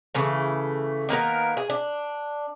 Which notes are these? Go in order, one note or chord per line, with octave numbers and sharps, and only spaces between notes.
C#3 E3 A3
D#3 A#3 B3 A#4
G#4
D4